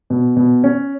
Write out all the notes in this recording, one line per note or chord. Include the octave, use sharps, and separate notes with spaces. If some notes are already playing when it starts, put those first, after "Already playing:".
B2
B2
C#4